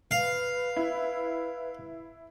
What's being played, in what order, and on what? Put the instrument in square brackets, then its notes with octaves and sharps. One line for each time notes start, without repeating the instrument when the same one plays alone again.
[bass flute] B4 [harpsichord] F5
[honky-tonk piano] E4